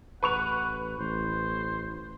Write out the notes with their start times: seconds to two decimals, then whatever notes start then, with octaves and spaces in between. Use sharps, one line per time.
0.23 A1 B4 F#5 C#6 F7
0.99 A1 C5